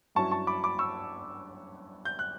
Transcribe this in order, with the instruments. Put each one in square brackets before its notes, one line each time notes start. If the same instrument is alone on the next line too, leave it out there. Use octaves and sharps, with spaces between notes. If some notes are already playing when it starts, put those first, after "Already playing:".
[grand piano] G2 F#3 C#4 E4 A5 C#6
A5 C#6
B5 D6
B5 D6
C#6 E6
G6
F#6